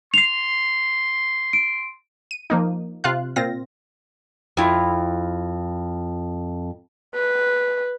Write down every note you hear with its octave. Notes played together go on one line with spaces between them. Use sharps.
C6 C7 F7
D7
D#7
F3 A#3 D#4
C3 F4 F5 F#6
A#2 C4 F4 A#6
F2 E4 F4
B4